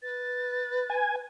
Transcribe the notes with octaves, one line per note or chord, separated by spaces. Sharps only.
B4 A6
G#5